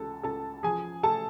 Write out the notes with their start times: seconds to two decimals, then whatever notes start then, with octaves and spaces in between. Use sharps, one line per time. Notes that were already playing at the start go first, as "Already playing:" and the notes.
Already playing: C#2 A4 A5
0.23 C#2 A4 A5
0.63 F3 G#4 G#5
1.03 A3 A4 A5